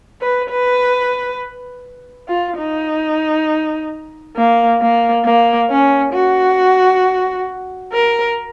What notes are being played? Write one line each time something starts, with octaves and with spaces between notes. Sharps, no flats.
B4
B4
F4
D#4
A#3
A#3
A#3
C#4
F#4
A#4